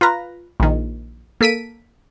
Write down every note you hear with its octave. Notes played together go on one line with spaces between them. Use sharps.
F4 B4 A#5
A#1 D#3
A#3 A4 B6 D7 D#7